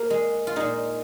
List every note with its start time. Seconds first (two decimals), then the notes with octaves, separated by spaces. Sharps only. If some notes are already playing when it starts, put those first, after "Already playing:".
Already playing: A#3
0.10 G#3
0.47 F4
0.56 A#2 G#3 D#4